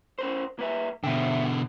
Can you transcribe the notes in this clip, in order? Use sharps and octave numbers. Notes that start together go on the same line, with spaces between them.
C#4 A#4 C5
A#3 B4 E5
B2 D3 E5 G5